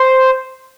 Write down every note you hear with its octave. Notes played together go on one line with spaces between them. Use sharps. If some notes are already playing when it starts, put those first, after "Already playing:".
Already playing: C5